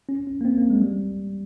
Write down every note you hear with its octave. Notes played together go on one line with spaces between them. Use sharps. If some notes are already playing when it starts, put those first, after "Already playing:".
C#4
C#4
A#3
C4
A#3
G#3
G3